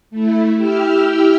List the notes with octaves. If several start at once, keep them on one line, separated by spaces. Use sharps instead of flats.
A3 E4
E4 G4 G5 E6 F6